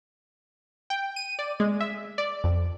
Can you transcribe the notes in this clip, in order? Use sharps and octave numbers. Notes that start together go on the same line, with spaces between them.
G5
D#7
D5
G#3
E5
D5
F2